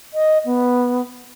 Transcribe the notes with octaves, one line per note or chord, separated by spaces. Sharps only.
D#5
B3